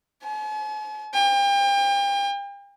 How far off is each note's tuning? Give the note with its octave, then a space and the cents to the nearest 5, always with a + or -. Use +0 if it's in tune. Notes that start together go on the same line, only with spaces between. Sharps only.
G#5 +45
G5 +35